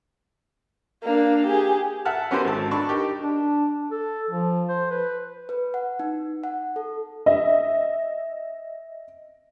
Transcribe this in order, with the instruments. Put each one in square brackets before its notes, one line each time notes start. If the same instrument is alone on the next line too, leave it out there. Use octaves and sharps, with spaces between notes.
[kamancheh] A#3 D4
G4 G#4
[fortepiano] E5 F#5 A5 F6
B3 C#4 F#4 G4 A#4 C5
G#1 A4 A5
D4 A5 B5 C#6
D#4 G4 A#4
[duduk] D4
A4
F3
C5
B4
[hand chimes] B4
F#5
D#4
F#5
A4
[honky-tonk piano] D#5 E5